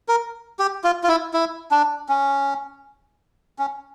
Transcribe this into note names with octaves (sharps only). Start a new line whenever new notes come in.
A#4
G4
F4
F4
E4
E4
D4
C#4
C#4